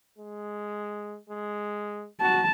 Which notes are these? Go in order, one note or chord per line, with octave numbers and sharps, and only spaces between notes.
G#3
G#3
F#4 A5